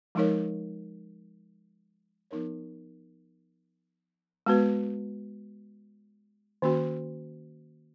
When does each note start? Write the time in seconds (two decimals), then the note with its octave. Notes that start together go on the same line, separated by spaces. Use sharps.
0.15 F3 G#3 D#4 A#4 C#5
2.31 F3 B3 D#4 A#4 C#5
4.46 G#3 B3 F#4 B4
6.62 D#3 A#3 C#4 F#4